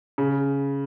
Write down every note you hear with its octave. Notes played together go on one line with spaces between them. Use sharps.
C#3